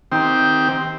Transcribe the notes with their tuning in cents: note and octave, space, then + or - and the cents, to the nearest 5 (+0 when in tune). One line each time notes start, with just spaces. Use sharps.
D#3 +15 C4 +0 G4 +0